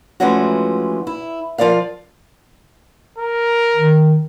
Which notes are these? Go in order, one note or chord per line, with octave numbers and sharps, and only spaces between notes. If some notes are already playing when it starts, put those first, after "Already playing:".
E3 F3 G#3 A3 C#4 F#4
E4
F3 F4 A#4 D5 F5
A#4
D#3